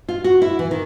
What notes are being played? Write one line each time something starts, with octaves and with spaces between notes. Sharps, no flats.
F4
F#4
E4
E3
D#3